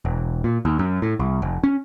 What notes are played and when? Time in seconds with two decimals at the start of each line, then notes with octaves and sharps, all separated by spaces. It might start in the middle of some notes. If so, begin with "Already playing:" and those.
0.05 E1
0.44 A#2
0.65 D#2
0.79 F#2
1.02 A2
1.19 C2
1.42 F1
1.64 C#4